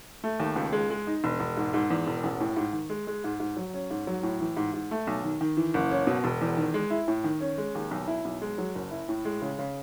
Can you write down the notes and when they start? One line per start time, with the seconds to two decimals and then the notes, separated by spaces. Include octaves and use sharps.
0.24 A3
0.40 D#2
0.56 C#2
0.73 G#3
0.90 G#3
1.07 D#4
1.24 E1
1.40 E1
1.57 G#2
1.74 G#2
1.90 E2
2.07 E1
2.23 A1
2.41 A2
2.57 G#2
2.73 D#3
2.90 G#3
3.07 G#3
3.24 G#2
3.40 G#2
3.57 F#3
3.74 C#4
3.91 G#2
4.07 F#3
4.23 A2
4.41 E3
4.57 G#2
4.73 G#2
4.91 A3
5.07 B1
5.24 D#3
5.41 D#3
5.57 E3
5.74 F#1
5.91 C#4
6.07 B2
6.24 E1
6.41 E2
6.57 D#3
6.74 G#3
6.90 E4
7.08 A2
7.24 D#3
7.41 C#4
7.58 G#3
7.75 D#2
7.91 B1
8.07 E4
8.25 B1
8.42 G#3
8.58 F#3
8.75 F#1
8.91 E4
9.09 A2
9.25 G#3
9.42 C#3
9.59 C#3